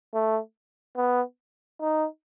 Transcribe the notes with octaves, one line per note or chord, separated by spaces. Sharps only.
A3
B3
D#4